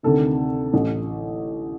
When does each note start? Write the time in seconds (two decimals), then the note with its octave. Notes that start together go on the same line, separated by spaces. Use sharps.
0.03 D2 C3 D#3 A4
0.74 A1 A2